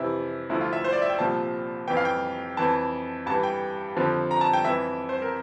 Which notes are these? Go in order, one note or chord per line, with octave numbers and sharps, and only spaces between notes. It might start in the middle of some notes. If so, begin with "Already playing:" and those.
Already playing: F2 C3 E3 E4
D2 D3 F3 E4
F4
E5
C5
D5
E5
G5
C2 A#2 F3 A5
F2 E3 G5
F5
G5
F2 E3 A5
G2 E3 A5
G5
F2 D3 F3
A#5
A5
G5
F2 E3 E5
C5
A#4